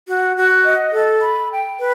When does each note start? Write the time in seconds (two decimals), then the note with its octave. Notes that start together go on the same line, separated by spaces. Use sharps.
0.07 F#4
0.36 F#4
0.65 D#5
0.93 A4
1.22 B5
1.51 G5
1.79 B4